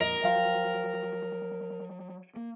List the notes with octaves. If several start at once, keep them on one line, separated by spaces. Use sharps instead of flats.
F2 A#2 A#4 D#5
F3 F#3 C5 F5 G5
A#3